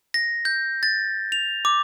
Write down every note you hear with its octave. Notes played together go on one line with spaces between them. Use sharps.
A#6
G6
A6
F7
D6